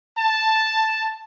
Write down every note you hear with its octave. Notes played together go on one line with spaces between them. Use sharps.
A5